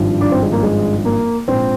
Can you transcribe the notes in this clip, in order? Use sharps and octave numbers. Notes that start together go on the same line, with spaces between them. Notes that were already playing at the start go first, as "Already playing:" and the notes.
Already playing: G#1 G2 F3
D4
C4
G#3
A#3
G#3
A#3
A#1 G#2 F3 C4